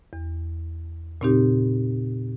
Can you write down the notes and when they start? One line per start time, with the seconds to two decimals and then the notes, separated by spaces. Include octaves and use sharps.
0.13 E2
1.21 A#2 C#3 C4 D#4 G4